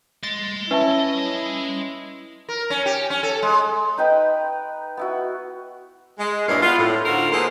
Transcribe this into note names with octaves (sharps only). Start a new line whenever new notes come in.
D#5 C6 A6
C#4 E4 B4 E5 A5
A#4
C#4
G4
C#4
A4
G#3
D#4 B4 G5 B5
B3 E4 F#4
G#3
G2 A#2 E4 C#5 D#5 F5
B3 F4
A2
D3 D#4 F4 F#4 A#4 C5
G#3 A#3 B3 A4 C5